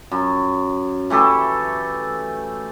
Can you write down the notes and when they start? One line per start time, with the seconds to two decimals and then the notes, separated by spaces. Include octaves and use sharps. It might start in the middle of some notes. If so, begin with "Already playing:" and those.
0.11 F#2
1.10 E3 A3 G4 A4